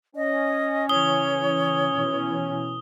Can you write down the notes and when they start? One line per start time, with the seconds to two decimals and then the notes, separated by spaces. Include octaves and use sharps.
0.16 C#4 D#5
0.89 C#3 E3 C#5 D#6 G7
1.94 B2 E3